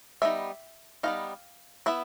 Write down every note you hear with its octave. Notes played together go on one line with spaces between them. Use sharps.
G3 B3 D#4 E5
G3 B3 D#4 F5
B3 E4 E5